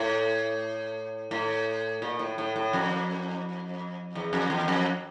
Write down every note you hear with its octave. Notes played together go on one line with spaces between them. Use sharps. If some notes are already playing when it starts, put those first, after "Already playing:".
Already playing: A2
A2
A#2
A2
A2
A2
F2
E2
F2
E2
F2